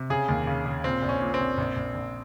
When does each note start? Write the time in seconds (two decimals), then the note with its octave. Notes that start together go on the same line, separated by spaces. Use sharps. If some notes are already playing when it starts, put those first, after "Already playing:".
Already playing: C3
0.10 C#3 G#4
0.29 D#2
0.47 C#3
0.66 C#3
0.84 A#2 C4
1.02 A#1
1.09 C#4
1.21 A#2
1.34 C4
1.40 A#1
1.58 A#1
1.77 A#1
1.95 A#1